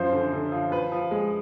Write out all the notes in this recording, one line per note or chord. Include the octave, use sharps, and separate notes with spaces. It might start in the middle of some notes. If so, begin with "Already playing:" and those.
Already playing: F#2 F3 C5
D3
D3
F3
F3 B4
F3
G#3